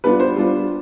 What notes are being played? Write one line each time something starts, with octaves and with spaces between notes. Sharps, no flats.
G3 B3 D4 F4 B4
C5
G3 B3 D4 F4